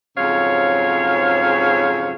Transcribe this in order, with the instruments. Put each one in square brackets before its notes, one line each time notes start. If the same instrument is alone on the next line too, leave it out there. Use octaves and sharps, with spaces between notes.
[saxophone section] F2 G#2 C#3 F#3 C#5 F5